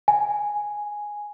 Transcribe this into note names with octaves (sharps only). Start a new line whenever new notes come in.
G#5